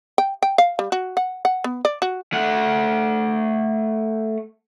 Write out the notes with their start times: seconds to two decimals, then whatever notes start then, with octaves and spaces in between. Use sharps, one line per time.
0.18 G5
0.42 G5
0.58 F5
0.79 G3
0.92 F#4
1.17 F#5
1.45 F#5
1.64 B3
1.85 D5
2.02 F#4
2.33 A3 F#5